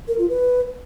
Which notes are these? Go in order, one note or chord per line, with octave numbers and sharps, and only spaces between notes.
A#4
F4
B4